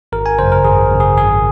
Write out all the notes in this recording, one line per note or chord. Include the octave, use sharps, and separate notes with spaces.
G#1 A#4
G#5
F#2 C#3 C5
A#4
G#1 G#4
F#2 C#3
G#4
G#1 G#4